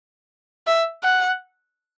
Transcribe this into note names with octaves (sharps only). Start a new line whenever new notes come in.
E5
F#5